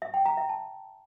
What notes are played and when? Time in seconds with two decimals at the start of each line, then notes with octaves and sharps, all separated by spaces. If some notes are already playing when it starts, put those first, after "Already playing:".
0.02 E5
0.14 G5
0.26 A#5
0.37 E5
0.49 A5